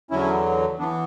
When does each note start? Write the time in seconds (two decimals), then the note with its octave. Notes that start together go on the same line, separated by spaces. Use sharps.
0.11 E2 D3 F#3 C#4 E4
0.79 E3 B3 D4